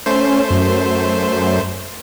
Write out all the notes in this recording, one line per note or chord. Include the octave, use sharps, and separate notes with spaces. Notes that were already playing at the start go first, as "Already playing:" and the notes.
A3 C#4 C5
F#2